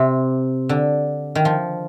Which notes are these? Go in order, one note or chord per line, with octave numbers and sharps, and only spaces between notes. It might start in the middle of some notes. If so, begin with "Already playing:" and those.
Already playing: C3
D3
D#3
F3